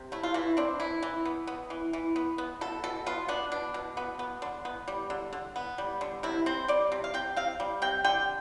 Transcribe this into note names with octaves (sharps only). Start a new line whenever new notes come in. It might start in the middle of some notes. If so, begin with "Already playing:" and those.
Already playing: C3
A3 E4
F4
E3 E4
C4 D4
E3 E4
E3
B3
B3
E3
E3
B3
B3
B2 A4
B2 A4
B3 F4
B3 D4
B2 D4
B2
B3
B3
D3
B3
G3
D3
D3
B3
G3
D3
C3 E4
C4 C5
G3 D5
C3
F5
C3 G5
C4 F5
G3
C3 G5
D3 G5